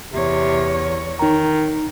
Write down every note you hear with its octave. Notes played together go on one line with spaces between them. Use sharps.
E2 C3 C#5
D#3 D#4 A#5